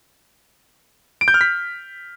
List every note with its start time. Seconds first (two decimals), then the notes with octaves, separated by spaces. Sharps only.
1.21 D7
1.28 G6
1.34 F6
1.41 B6